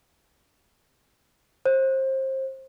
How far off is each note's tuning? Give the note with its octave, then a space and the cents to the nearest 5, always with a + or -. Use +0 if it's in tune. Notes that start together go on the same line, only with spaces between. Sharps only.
C5 +25